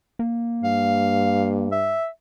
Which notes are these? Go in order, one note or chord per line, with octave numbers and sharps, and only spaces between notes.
A#3
G2 F5
E5